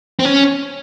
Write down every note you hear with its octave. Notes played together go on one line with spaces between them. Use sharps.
C4
C#4